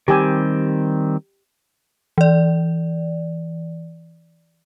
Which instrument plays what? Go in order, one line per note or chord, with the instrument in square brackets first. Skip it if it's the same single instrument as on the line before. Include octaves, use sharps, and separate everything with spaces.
[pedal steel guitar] D#3 G3 C4 [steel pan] G4 G#5
[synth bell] E3 D5